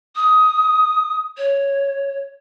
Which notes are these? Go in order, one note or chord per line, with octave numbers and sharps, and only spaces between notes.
D#6
C#5